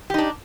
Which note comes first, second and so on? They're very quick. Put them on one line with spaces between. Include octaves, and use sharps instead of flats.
G4 D#4 D4